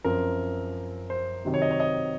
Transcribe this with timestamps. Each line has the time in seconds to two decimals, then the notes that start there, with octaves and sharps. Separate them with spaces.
0.04 F#2 F3 C4 A#4
1.10 C5
1.45 C3 D#3 F#3 C4
1.54 C#5
1.62 D#5
1.71 C#5
1.80 D#5